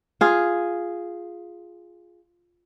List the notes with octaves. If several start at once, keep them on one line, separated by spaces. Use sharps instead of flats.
F4 G#4